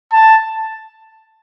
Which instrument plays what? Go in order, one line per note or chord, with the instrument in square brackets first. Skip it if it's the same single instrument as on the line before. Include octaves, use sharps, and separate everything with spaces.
[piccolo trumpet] A5